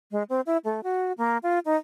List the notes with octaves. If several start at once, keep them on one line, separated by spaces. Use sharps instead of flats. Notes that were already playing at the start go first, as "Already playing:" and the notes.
G#3
C4
E4
A3
F#4
A#3
F4
D#4